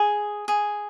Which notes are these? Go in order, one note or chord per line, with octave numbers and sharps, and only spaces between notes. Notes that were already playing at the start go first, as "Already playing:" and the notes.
Already playing: G#4
G#4